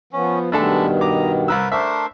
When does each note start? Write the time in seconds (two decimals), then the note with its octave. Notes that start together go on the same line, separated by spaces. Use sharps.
0.13 F3 B3 C#4
0.52 G2 B2 D#3 G#3 A3 D4 A4 B5
1.01 D#5 A#5 D6
1.48 C2 A#4 B4 B5 E6
1.72 A3 D4 A#4 C5 E5